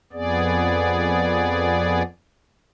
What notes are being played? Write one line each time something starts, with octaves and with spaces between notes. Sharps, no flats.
F2 B3 G#4 D5